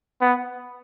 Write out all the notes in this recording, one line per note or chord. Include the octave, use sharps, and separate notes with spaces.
B3